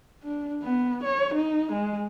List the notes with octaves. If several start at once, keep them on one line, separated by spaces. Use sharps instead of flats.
D4
B3
C#5
D#4
G#3